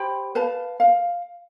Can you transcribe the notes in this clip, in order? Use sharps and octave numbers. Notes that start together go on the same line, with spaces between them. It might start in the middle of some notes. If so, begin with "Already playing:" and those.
Already playing: G4 C5 G5 B5
B4 F5 A5
F5